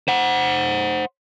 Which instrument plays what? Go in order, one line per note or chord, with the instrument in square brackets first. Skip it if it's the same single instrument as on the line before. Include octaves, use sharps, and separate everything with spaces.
[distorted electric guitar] C5 F#5